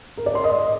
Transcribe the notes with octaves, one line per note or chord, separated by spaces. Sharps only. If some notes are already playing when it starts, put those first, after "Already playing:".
A#4
D5
C6
D#5